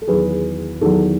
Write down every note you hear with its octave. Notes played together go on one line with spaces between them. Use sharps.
A4
E2 D#3 F#3 G#4 B4
E2 D#3 F#3 A4